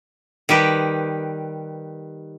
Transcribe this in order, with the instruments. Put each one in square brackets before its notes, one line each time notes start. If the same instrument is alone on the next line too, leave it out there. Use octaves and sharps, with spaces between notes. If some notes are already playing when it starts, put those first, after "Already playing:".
[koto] D#3 G3 G4 B4